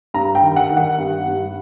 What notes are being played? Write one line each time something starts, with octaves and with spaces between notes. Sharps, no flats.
G2 A#5
G5
D#3
F#5
D#3
F#5
G2
G2